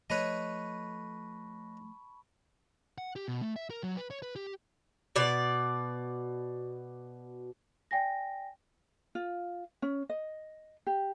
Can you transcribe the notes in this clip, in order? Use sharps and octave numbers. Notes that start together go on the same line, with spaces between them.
F3 A3 B4 C#5 D#5 A5 B5 C#6
F#5
G4
B2
A3
E5
A#4
F#3
B4
C#5
B4
G4
B2 D5
D5 G5 G#5 A#6
F4
C#4
D#5
G4